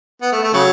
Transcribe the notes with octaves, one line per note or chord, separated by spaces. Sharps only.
B3
A3
A3
C#3 F#3